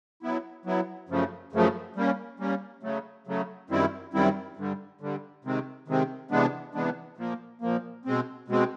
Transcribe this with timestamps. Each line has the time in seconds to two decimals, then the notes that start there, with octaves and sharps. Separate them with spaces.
0.22 F#3 B3 E4
0.65 F#3 B3 E4
1.09 F#2 C#3 F3 A3
1.53 F#2 C#3 F3 A3
1.96 G3 A#3 C#4
2.40 G3 A#3 C#4
2.83 C#3 F#3 A3
3.27 C#3 F#3 A3
3.70 F#2 D#3 G3 C4 E4
4.14 F#2 D#3 G3 C4 E4
4.57 G2 D3 G3
5.01 G2 D3 G3
5.45 C3 D#3 G#3 C4
5.88 C3 D#3 G#3 C4
6.31 C3 E3 G#3 B3 D4
6.74 C3 E3 G#3 B3 D4
7.17 A#2 F3 A#3
7.61 A#2 F3 A#3
8.05 B2 G#3 C4
8.48 B2 G#3 C4